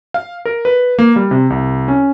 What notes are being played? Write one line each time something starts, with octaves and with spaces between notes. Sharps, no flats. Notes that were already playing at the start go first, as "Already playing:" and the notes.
F5
A#4
B4
A#3
G3
C3
C2
C#4